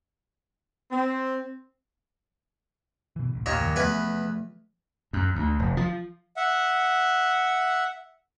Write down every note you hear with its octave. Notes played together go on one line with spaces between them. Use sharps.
C4
B2 E3
D#1 A1
D#2 A#2 C#5
E2 G2 D#3
E2 F3 F#3 A3 B4 G#5
F#2
D2
F1
F3
E5 F#5